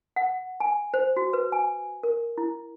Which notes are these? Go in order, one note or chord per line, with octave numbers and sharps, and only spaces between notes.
F#5
G#5
C5
F#4
B4
G#5
A#4
E4